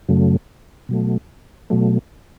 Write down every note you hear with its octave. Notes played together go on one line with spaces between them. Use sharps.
F#2 C#3 F#3 A3
B2 F#3 A3
B2 F#3 A3